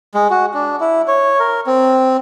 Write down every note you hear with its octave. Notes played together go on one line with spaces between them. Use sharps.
G#3
F#4
D4
E4
C#5
A#4
C4